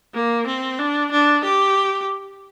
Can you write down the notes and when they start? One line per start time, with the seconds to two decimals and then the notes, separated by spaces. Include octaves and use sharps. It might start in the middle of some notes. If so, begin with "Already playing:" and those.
0.14 A#3
0.47 C4
0.79 D4
1.12 D4
1.44 G4